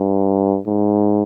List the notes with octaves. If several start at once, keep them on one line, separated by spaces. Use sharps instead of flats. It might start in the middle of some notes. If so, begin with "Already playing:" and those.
Already playing: G2
G#2